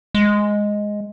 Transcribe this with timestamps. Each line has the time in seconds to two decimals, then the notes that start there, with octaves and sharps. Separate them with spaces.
0.15 G#3